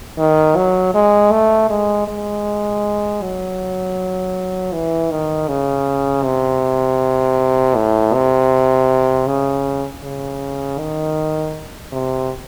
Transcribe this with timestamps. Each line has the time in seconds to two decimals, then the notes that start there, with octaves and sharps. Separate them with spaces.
0.18 D#3
0.56 F#3
0.94 G#3
1.32 A3
1.70 G#3
2.08 G#3
3.22 F#3
4.73 E3
5.11 D#3
5.48 C#3
6.24 C3
7.75 A2
8.14 C3
9.27 C#3
10.03 C#3
10.79 D#3
11.92 C3